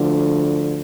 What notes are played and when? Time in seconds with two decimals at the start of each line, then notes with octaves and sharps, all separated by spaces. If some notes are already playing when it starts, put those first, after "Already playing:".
Already playing: D2 D3 F3